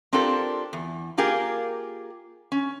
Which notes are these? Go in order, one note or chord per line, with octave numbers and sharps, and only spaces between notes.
C4 D4 F4 G4 A4 A#4
E2
A#3 F4 G4 G#4 A#4
C#4